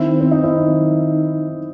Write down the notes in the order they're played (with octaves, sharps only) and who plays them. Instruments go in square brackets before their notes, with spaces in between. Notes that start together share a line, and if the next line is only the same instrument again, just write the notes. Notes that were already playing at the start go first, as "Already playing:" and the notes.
Already playing: [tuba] D#3 [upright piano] C4 E4
[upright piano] C4
D#4
[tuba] D#3 [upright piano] C4 E4